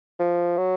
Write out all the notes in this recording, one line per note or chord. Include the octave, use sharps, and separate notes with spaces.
F3
F#3